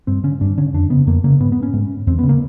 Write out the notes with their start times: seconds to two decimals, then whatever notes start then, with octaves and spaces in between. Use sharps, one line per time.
0.07 G2 C4
0.24 D3 C#4
0.41 G2 D4
0.57 D3 C#4
0.74 F2 D4
0.90 C#3 B3
1.07 F2 A#3
1.24 C#3 A#3
1.40 G#2 B3
1.52 B3
1.63 C#4
1.73 G#2
2.07 E2 C4
2.19 B3
2.23 C#3
2.29 A#3